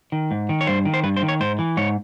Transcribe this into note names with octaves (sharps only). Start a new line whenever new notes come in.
D#3
G#2
D#3
C#5
G2 C5
D#3
C5
G2 B4
C5
D#3
C#5
G#2 C5
E3
G#2 C#5